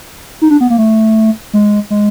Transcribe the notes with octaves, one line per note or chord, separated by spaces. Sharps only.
D#4
D4
B3
A#3
A3
G#3
G#3